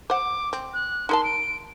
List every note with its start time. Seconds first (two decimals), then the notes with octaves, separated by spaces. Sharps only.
0.10 C5 F#5 D6
0.53 C4
0.74 F#6
1.09 D#4 A#4 A5 C6
1.24 D7